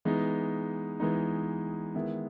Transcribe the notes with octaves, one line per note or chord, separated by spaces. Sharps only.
E3 G#3 B3 D#4
E3 G#3 B3 D#4
D#3 G#3 B3 E4